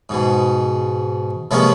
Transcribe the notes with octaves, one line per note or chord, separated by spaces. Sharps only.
G#2 B2
C3 F3 G#3 A#3 B3 C#4